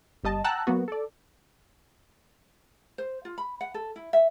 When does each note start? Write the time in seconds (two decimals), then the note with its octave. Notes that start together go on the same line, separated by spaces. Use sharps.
0.24 G1 G3 D#5 A5
0.44 F#5 G5 A5 A#5 E6 F#6
0.67 F#3 A#3 B3 F#4
0.88 A4 D5
2.98 C5
3.25 F4
3.38 B5
3.61 F#5
3.74 A4
3.96 E4
4.13 E5